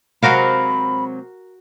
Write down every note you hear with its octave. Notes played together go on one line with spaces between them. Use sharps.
C3 F#3 G#3 F#4 A#4 F5 B5